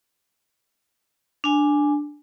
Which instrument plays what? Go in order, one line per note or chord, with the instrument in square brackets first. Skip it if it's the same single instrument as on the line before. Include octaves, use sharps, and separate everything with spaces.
[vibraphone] D4 G#5